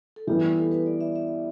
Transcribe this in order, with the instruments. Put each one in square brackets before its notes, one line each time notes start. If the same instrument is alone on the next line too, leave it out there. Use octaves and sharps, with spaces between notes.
[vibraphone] A4
[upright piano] E3 G3 B3 [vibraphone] G4
[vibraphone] G4
A4
B4
D5
E5
E5